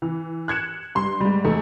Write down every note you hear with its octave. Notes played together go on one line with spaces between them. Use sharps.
E3
F#6 G#6 C#7 E7
G2 C6
G#2 G3
E2 A3 D#4